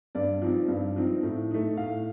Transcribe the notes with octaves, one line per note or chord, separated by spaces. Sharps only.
G2 D5
F3 C4 D#4
G2
F3 C4 D#4
A2
A3 D#4
A2 F5